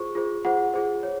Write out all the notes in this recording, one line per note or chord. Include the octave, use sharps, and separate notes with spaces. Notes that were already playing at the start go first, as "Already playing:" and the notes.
Already playing: F4 G#4 C5 C#6
F4 G#4 C5
F4 G#4 C5 F#5
F4 G#4 C5
C#5